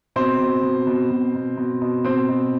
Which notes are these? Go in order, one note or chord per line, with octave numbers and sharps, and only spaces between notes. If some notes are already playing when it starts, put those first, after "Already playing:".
B2 C4 C5
B2
B2
B2
B2
B2
B2
B2
B2 C4 C5
B2